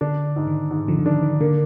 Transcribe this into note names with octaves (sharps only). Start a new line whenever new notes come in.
D3 D4
G#2
D#3
G#2
D3 F3
D3
D#3 D4
D#3
D3 A#3